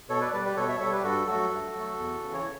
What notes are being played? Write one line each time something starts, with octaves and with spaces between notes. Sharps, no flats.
B2 A4 C#5
B4 D5
G3 B4 D5
G4 B4
B2 A4 C#5
C#5 E5
G3 A4 C#5
G4 B4
G2 F#4 A4
F#3 A3 F#4 A4
G2
F#3 A3
E2
C#3 E3
C#5